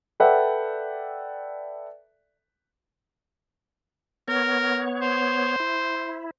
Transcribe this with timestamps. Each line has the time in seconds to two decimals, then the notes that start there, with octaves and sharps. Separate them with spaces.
0.20 A4 B4 D5 E5 F#5 G5
4.28 B3 A#4 C#5
5.01 C5
5.60 E4